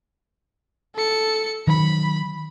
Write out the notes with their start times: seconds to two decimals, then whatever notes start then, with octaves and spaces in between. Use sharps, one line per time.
0.96 A4 C#7
1.67 D#3 F#3 B5